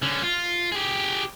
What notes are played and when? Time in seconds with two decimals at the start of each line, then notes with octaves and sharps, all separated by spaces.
0.02 D3 C#4
0.23 F4
0.72 G4 G#4